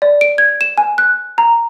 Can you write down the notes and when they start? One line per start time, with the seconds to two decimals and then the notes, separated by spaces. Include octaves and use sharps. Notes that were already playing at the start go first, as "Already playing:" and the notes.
0.02 D5
0.21 D7
0.38 G#6
0.61 E7
0.78 G#5
0.98 F#6
1.38 A#5